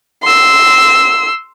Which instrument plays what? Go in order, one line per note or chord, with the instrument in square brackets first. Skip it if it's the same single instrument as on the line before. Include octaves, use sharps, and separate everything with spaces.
[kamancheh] C6 E6